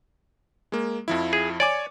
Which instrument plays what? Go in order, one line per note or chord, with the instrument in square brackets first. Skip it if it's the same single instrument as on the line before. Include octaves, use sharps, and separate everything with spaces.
[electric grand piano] G#3 A#3
F2 F3 E4
[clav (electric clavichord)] G#4
[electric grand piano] C#5 G#5 D6 [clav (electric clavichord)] D5